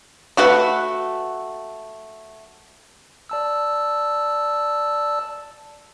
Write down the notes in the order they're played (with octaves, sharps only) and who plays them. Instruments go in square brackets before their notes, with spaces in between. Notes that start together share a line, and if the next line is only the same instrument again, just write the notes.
[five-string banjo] A3 F#4 B4 F#5
[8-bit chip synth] D5 A5 E6